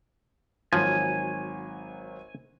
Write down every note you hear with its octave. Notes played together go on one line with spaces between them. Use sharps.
G#1 F3 F#3 G#5 D#7